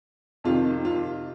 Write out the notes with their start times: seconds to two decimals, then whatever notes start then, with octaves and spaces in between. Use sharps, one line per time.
0.44 F2 C3 D#3 F4
0.85 F4